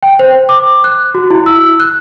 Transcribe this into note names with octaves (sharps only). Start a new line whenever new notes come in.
G5
C5
D6
F#6
F#4
E4
E6
F#6